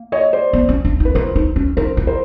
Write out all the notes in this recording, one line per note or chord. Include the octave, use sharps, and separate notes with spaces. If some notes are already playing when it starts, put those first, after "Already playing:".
Already playing: A#3
C#5 D#5
C5 D5
B3
C#4
D4
D#4
B4
E4 A#4 C5
D#4
C#4
D#4 A#4 C5
E4
A#4 C5